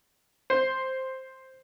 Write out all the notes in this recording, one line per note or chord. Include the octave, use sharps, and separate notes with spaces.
C5